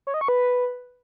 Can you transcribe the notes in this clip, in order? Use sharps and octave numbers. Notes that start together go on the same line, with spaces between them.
C#5
D#5
C#6
B4